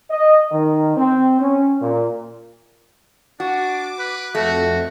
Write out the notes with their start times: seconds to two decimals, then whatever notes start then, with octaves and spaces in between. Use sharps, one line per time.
0.11 D#5
0.51 D#3
0.96 C4
1.41 C#4
1.81 A#2
3.40 D4 F#4 D6
3.99 B4
4.35 F2 A3 F#4